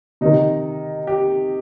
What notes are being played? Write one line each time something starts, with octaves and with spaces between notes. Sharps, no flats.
C3 D#3 D#4
G4